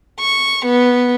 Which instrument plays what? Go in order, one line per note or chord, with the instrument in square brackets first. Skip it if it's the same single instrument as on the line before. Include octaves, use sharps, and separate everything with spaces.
[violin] C#6
B3